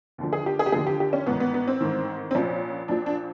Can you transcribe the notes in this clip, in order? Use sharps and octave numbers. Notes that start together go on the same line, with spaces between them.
D#2 D3 F3
G#4
G4
G#4
G4
D#2 D3 F3 G#4
G4
G4
C#4
A1 G#2 D#3 B3
B3
B3
C4
A1 G#2 D#3
C4
A#1 A#2 F3 C#4
A#1 A#2 F3 D4
D4